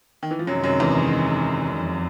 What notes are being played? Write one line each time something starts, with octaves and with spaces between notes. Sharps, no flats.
D#3
E3
F3
F#2 C3 D#3 F#3 G#3
F#2 F#3
E2 E3
F2